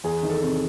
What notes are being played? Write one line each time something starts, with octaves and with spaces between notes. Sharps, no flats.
E2 G#4
D#3
A4
C3